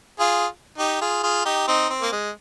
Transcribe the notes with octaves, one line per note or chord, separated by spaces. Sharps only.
F4 G#4
D#4 G4
F4 G#4
F4 G#4
D#4 G4
C4 D#4
C4
A#3
G#3